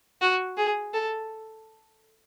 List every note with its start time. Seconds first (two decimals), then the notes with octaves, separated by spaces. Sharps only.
0.21 F#4
0.57 G#4
0.94 A4